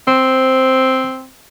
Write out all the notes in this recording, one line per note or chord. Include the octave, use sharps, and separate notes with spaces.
C4 C5